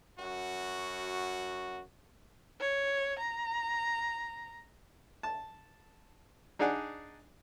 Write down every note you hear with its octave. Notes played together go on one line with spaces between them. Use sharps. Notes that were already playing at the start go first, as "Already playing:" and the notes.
F#2 F#4
C#5
A#5
A5
D4 D#4 G#4 D5 F#5 G#5